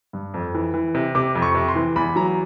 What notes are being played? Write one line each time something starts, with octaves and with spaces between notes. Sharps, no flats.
G2
F2
E3
E3
C3
C3 D6
F2
C#6
C3
C6
E3
E2 B5
F#3 A#5